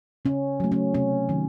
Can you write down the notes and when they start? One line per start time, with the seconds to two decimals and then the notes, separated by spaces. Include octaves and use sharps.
0.25 C#3 C#4
0.60 F#3 A3
0.72 C#4
0.94 C3 C#4
1.29 D#3 F#3